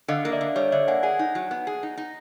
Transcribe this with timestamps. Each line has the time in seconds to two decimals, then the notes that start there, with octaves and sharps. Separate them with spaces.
0.08 D3 D#5 F5
0.25 A#3
0.32 D5 E5
0.41 D3
0.56 G3 C#5 D#5
0.72 D3 D5 E5
0.88 A#3 F#5 G#5
1.03 G#4 F#5 G#5
1.19 D#4
1.35 F#3
1.51 B3
1.67 G#4
1.83 D#4
1.97 D#4